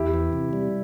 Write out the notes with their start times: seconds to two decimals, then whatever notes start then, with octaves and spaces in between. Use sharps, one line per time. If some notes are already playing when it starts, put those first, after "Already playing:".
Already playing: E2 E4 G4
0.14 E3
0.33 C3
0.53 G3